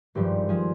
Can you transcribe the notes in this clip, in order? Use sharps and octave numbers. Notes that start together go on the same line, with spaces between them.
G#1 G2 F3 G4
F3 G#4